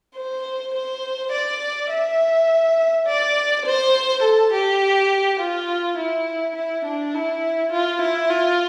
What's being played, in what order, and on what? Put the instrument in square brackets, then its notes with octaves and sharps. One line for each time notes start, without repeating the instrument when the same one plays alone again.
[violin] C5
C5
D5
E5
D5
C5
A4
G4
F4
E4
E4
D4
E4
F4
E4
F4